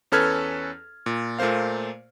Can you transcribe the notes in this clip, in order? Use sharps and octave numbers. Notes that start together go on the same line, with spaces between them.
E2 C#4 A4 B4 F6 G#6
A#2
A#2 A3 A#3 C5 F5